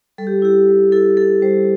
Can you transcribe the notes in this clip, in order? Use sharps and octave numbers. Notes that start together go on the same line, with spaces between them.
G3 A4
G4
E4 G4
G3
E4 A4
E4 A4
G3 C5